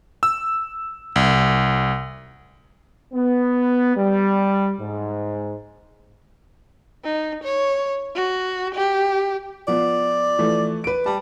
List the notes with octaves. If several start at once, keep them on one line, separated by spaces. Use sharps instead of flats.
E6
C2
B3
G3
G#2
D#4
C#5
F#4
G4
F3 B3 D5
E3 F3 A3
B4 D7
G3 A5